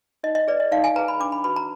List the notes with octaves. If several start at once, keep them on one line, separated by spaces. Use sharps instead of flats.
D#4 D#5
D#5
G#4 B4 D5
D#5
D#4 F5
G#5
G#4 B4 A#5
B5
D4 D6
B5
F#4 B4 B5
A#5